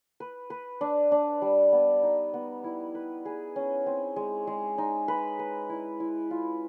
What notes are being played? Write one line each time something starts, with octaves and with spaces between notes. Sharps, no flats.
B4
B4
D4
D4
G3
B3
D#4
B3
E4
B4
G#4
C#4
C4
G#3
G#3
D#4
B4
B4
E4
E4
F4